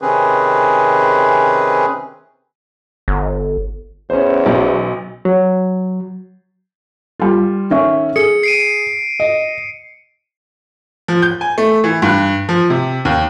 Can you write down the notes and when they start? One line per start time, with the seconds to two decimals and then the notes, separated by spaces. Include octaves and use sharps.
0.02 C3 D#3 C4 C#4 G#4 B4
3.08 G1
4.10 E2 C#4 C5
4.46 B1
5.25 F#3
7.20 G3 F4
7.70 D#3 C#4 E5
8.16 G#4 C#7
8.43 C7 D7 D#7
9.20 D#5
11.08 F3
11.22 G6
11.41 G#5
11.58 A3
11.84 E3
12.02 G2
12.49 F3
12.70 C3
13.05 D#2